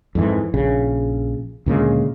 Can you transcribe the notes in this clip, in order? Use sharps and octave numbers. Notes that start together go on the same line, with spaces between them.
F2 G#2 E3
A#1 C#3
D2 A#2 C#3 G#3